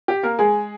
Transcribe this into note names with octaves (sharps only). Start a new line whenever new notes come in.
G4
A#3 A#4
G#3 G#4